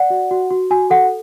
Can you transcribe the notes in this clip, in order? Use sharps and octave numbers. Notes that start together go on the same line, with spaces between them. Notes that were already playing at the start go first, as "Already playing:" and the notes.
Already playing: D5 F#5
F#4
F#4
F#4
F#4 G#5
A4 F#5